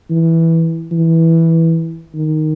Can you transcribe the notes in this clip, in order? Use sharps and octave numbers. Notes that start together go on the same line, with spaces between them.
E3
E3
D#3